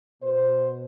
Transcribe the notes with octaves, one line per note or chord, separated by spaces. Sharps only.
B2 C5